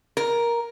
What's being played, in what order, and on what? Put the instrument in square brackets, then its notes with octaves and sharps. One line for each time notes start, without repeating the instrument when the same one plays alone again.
[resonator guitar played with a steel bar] A#4